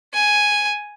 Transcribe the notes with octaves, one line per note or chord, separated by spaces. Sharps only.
G#5